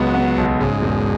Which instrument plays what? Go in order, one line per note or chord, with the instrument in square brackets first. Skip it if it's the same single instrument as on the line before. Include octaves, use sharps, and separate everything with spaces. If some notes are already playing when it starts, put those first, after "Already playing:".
Already playing: [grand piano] C#2 B3 [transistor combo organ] F#3
[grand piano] B3
B1
[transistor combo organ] G#2 [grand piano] C#3
[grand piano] E1